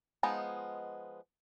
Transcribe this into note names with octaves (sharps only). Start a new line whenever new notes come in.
F3 G#3 B3 D#4